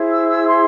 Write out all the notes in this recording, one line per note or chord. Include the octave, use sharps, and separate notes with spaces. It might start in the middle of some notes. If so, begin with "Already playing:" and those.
Already playing: E4 G#4 C5
E6
E6
C6